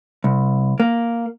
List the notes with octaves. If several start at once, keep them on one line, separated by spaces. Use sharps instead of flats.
C2
A#3